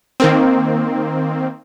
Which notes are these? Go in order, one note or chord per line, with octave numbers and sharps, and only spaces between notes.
D#3 A#3 C4